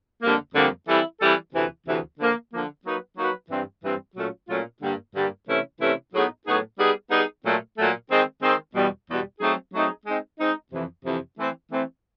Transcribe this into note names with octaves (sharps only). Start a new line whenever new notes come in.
F2 D3 G3 A#3
F2 D3 G3 A#3
E3 G3 C4 E4 A4
E3 G3 C4 E4 A4
D2 C3 E3
D2 C3 E3
D3 F3 A#3
D3 F3 A#3
F#3 A#3 D#4 F#4 B4
F#3 A#3 D#4 F#4 B4
G2 E3 G3 C4
G2 E3 G3 C4
A#2 F#3 A3 C#4 F4
A#2 F#3 A3 C#4 F4
G2 D3 G3 A#3
G2 D3 G3 A#3
C3 E3 A3 C#4 E4
C3 E3 A3 C#4 E4
A2 F#3 B3 D#4 G#4
A2 F#3 B3 D#4 G#4
G3 B3 D#4 G#4
G3 B3 D#4 G#4
A#2 F#3 A3
A#2 F#3 A3
D#3 G#3 C4
D#3 G#3 C4
E2 B2 G3
E2 B2 G3
F#3 A3 C4 D#4 G#4
F#3 A3 C4 D#4 G#4
G#3 C4 D#4
G#3 C4 D#4
F2 C3 E3
F2 C3 E3
E3 A3 C4
E3 A3 C4